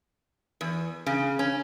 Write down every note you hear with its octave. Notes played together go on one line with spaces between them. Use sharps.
E2
C#3
C#4